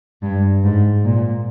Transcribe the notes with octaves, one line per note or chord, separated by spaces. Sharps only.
G2
G#2
A#2